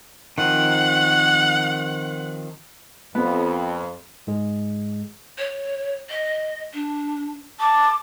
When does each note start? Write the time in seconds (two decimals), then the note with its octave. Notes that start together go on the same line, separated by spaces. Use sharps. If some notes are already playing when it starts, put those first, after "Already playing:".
0.38 D#3 F3 C4 F#5
3.15 F2 B3
4.27 G#2 G#3 G#4
5.38 C#5
6.09 D#5
6.73 D4
7.60 A5 D6